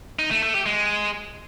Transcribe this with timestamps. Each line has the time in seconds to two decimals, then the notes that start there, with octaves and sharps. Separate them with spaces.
0.19 D#4
0.31 A3
0.43 A3
0.54 G4
0.66 G#3